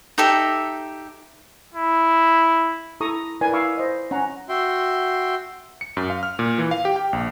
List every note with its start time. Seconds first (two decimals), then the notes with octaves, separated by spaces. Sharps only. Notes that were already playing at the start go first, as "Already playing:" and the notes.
0.18 D#4 G4 A4 E5
1.74 E4
3.00 E4 A4 A#5 C#6 D#6
3.41 E4 A#4 B4 D5 G#5
3.53 E4 F5 B5 C#6 D6 E6
3.78 C5 D#5
4.11 C#4 F#5 A#5
4.49 F#4 E5 G5 C6
5.81 C#7
5.97 F#2
6.10 F5
6.23 F6
6.39 A#2
6.58 E3
6.71 F5
6.85 G4
6.96 G5
7.13 A#1